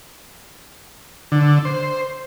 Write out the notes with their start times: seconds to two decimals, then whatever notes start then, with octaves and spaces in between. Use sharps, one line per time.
1.32 D3
1.65 C5